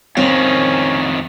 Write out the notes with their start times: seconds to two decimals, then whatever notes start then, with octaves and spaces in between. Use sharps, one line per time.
0.17 F2 D#3 C4 C#4 C#5